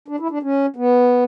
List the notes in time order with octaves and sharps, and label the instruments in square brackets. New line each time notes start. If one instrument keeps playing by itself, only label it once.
[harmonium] D4
E4
D4
C#4
B3